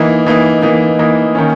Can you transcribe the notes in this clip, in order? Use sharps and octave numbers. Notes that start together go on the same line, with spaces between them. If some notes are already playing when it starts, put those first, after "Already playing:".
Already playing: E3 A#3 D#4
E3 A#3 D#4
E3 A#3 D#4
E3 A#3 D#4
D#3 A#3 C#4